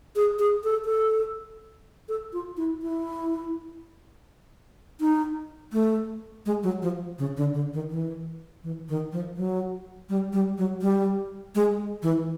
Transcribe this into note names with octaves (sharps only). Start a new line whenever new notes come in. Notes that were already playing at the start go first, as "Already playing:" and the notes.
G#4
G#4
A4
A4
A4
F4
E4
E4
D#4
A3
G#3
F#3
F3
C#3
D3
D3
D#3
E3
E3
D#3
F3
F#3
G3
G3
F#3
G3
G#3
E3